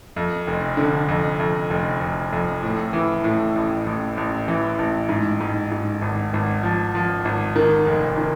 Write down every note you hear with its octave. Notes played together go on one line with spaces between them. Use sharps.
F2
F1
D3
F2
F2
F1
F1
F2
A2
E3
A2
A1
A1
A1
E3
A1
G#2
G#2
G#2
G#1
G#1
F3
F3
G#1
D#3
F1
D#3